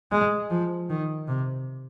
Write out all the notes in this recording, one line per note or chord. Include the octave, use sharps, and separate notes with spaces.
G#3
F3
D#3
C3